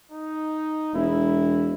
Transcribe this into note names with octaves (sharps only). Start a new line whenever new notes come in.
D#4
E1 E4